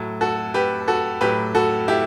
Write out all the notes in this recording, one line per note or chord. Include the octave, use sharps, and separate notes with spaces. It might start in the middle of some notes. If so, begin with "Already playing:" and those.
Already playing: A2 F#3
F#4 A4
G4 B4
F#4 A4
A2 F#3 G4 B4
F#4 A4
E4 G4